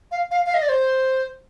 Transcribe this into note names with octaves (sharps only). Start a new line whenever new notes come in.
F5
F5
F5
D#5
D5
C5